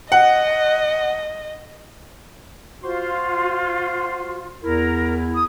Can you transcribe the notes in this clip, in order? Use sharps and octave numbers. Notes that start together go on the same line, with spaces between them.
D#5 F#5
F4 F#4 C5 C6
E2 E4 A#4
D#6